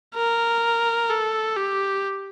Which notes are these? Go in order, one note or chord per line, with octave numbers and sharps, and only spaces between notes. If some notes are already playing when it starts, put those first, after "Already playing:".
A#4
A4
G4